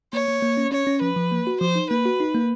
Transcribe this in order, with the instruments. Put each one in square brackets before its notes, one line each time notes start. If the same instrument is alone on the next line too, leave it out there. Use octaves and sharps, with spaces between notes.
[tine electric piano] A#3 [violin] C#5
[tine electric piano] A#3
A#3
C#4
[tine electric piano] C#4 [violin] C#5
[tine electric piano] C#4
[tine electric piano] F3 [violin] B4
[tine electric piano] F3
A#3
F#4
[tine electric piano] F3 [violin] C5
[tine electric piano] D#4
[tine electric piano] A#3 [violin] B4
[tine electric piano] F#4
D#4
A#3